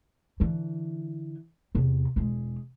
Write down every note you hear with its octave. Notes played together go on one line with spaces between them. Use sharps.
D3 E3
E2 C3
E1 G#3